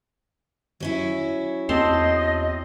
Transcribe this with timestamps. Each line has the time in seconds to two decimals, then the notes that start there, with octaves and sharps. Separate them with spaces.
0.80 F#3 C#4 E4
1.69 E2 C4 D#5 A5 C6